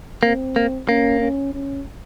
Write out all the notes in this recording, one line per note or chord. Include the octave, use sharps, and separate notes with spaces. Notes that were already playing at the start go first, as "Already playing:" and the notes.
A#3 C4
A#3
A#3 C#4
C#4
C#4